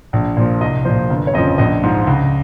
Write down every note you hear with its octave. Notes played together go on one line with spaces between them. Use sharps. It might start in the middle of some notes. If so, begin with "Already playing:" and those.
A#1
A#2 F3
C2 D#5
A#2 F3 C5
G1
C#5
F2 C#3 F3 D#5
A#1 D#5
G#2 F3
C#2